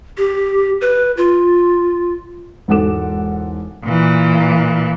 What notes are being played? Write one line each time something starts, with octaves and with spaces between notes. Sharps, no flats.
G4
B4
F4
E1 G#2 A4 F#5 D6 E7
A#2 E3